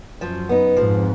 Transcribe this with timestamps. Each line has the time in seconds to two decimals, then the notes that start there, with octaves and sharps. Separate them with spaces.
0.21 F#2 F3
0.49 B3 D#4
0.76 F2 G#2 F3